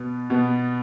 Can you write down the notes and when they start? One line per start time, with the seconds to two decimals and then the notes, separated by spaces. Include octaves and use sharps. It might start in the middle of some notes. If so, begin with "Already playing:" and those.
Already playing: B2 B3
0.30 B2 B3